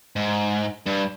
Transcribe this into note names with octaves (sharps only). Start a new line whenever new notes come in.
G#2
G2